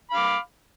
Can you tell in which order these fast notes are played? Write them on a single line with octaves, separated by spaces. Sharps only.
B5 F5 D6